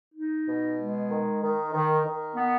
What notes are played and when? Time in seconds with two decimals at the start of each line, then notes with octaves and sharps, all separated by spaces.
0.15 D#4
0.46 B2
0.78 G#3
1.09 D#3
1.41 D#3
1.72 D#3
2.04 D#3
2.36 B3